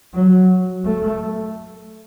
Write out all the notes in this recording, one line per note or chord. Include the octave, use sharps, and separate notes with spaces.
F#3
A3